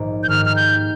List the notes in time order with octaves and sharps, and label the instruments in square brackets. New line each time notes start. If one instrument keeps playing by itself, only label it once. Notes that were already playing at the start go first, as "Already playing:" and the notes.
Already playing: [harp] A#1 G#2 D#3
[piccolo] G6
[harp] G#2 D#3 A#3 D#4 G4 [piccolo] F6
[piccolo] F6
G6